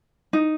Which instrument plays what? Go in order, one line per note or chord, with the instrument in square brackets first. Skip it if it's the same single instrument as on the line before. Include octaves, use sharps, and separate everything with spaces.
[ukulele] D#4